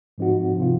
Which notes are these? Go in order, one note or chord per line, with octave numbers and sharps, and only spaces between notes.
G#2 F3 C4 D#4 F#4
C3 F3 C4 F4